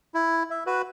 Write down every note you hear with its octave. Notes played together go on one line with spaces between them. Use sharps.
E4
E5
F#4 B4